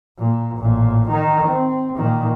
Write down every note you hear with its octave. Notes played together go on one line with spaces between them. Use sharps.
A#2
A1 A#2
D#3 D#4
C4
A#2 D#3